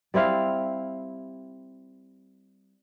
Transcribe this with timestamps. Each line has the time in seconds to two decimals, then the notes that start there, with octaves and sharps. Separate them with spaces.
0.14 G3 C4 E4 F5